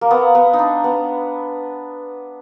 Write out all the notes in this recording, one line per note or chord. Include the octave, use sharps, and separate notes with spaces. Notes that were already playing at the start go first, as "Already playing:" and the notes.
A#3
B3
B3
D#4
D4
B3